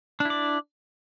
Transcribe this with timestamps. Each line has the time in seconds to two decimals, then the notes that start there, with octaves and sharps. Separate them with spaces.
0.20 D4
0.25 E4
0.30 D5